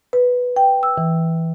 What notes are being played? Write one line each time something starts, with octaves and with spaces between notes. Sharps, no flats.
B4
G5
E6
E3